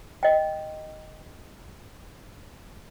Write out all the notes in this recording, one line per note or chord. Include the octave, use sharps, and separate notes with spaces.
D#5 G5